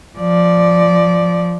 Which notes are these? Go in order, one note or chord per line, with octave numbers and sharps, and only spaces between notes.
F3 D5